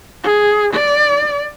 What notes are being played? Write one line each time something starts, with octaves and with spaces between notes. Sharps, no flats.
G#4
D5